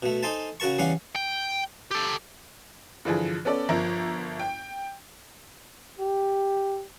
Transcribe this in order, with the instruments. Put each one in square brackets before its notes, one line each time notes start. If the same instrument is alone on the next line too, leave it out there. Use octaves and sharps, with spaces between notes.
[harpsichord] B2 A3
D#4 A4 C5 G#5 A5
C#3 F#4 A#4 A5 C#6
E2 G3 C#4 F5 F#5
[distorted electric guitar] G5
G4 A4
[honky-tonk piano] G2 D3 E3 F3 G#4
B3 C#4 A4 D5
G1 F3 A#4 E5
G5
[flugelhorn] G4